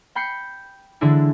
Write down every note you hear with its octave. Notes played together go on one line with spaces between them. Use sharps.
G5 B5 G6 C7 C#7
D3 E3 G#3 D4 E4